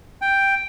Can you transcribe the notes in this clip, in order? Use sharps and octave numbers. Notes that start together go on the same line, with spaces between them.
G5